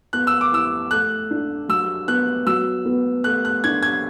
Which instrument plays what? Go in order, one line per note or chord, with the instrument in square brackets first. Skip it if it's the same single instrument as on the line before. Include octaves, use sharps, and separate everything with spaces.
[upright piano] B3 [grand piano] F#6
[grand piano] E6
D6
[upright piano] E4 [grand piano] E6
[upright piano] A3 [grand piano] F#6
[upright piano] D4
[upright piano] F#3 [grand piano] E6
[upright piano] B3 [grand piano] F#6
[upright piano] F#3 [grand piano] E6
[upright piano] B3
[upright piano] A3 [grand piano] F#6
[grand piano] F#6
[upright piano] D4 [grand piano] G#6
[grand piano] G#6